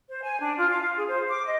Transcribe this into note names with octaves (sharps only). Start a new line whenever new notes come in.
C5
G#5
D4
F4
F5
F4
G#4
C5
D6
D#5